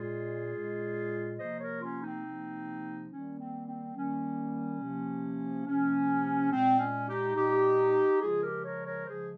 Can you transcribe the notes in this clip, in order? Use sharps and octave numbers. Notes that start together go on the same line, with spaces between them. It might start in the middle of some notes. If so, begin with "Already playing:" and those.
Already playing: A#2 G#3 F4 G#4
A#2 G#3
C3 F3 A#3 C5 D#5
A#4 C#5
C#4 F4
C4 D#4
C3 F3 A#3
D#3 G3 A#3 C#4
C4
C4
D#3 G3 A#3 C#4
C3 F3 A#3
C3 F3 A#3 C#4
A#2 G#3 C4
C#4
D#4 G4
A#2 G#3 D#4 G4
C#3 F3 G#3 F4 G#4
G4 A#4
A#4 C#5
A#4 C#5
C#3 F3 G#3 G#4 C5